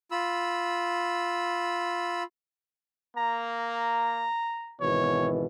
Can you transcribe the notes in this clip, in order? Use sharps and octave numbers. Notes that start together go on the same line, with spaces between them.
F4 B5 E6
A#3 A#5
G#1 B2 E3 C#5